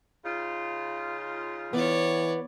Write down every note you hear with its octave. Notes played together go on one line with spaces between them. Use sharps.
C#3 D#4 F4
E3 B3 C#5 D5